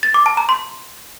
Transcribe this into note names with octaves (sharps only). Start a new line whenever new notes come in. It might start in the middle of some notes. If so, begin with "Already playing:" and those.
A6
D6
A5
A#5
C6